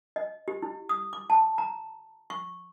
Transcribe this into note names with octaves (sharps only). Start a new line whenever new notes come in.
D#5
G4
E4
D#6
D6
A5
A#5
C#6